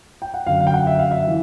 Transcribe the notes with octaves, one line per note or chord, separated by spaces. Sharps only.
G5
F#5
F#2 D3 F5
F5
G5
F#5
E5
F5
E5
E3